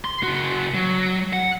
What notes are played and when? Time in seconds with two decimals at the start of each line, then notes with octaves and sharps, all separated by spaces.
0.05 C6
0.23 C#3 F#4
0.74 F#3
1.33 F#5